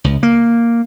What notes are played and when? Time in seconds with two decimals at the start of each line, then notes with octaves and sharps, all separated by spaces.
0.04 C#2
0.23 A#3